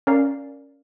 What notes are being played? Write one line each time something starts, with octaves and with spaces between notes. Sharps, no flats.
C#4 A#4 D5 F5